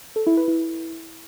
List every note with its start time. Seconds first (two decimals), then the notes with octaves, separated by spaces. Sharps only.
0.16 A4
0.27 E4
0.37 B4
0.48 E4